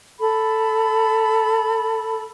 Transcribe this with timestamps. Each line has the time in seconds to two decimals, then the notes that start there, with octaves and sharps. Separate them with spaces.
0.19 A4 B5